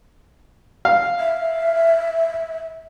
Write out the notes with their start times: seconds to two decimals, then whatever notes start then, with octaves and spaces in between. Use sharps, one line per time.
0.85 F5
1.19 E5